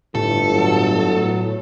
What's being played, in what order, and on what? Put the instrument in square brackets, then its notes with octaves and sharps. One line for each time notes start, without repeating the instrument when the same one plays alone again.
[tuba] G1 [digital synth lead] A2 [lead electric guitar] A4
[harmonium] F#3